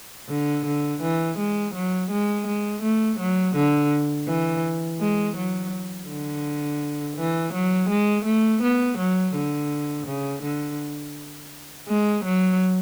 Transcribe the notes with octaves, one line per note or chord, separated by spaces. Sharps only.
D3
D3
E3
G#3
F#3
G#3
G#3
A3
F#3
D3
E3
G#3
F#3
D3
E3
F#3
G#3
A3
B3
F#3
D3
C#3
D3
G#3
F#3